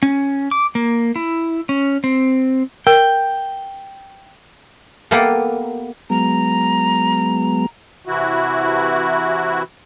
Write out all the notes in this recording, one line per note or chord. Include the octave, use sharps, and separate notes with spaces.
C#4
D6
A#3
E4
C#4
C4
A#4 G5
A#3 B3 G4 A4 A#4
F#3 G#3 B3 A#5
C3 E3 E4 F#4